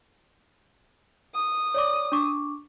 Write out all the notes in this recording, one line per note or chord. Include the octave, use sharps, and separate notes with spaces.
D#6
C#5 D5 D6
D4 C#6 D6